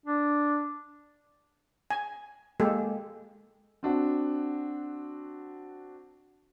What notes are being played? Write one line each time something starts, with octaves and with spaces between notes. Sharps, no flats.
D4
G#5
G#3 A#3 G4 A4
C4 D4 F#4